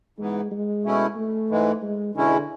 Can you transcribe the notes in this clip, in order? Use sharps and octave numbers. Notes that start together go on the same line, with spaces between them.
G#2 E3 G#3 B3
G#3
B2 A3 C#4 E4
A3
G#2 E3 G#3
G#3
E2 B2 D3 G#3 C#4 E4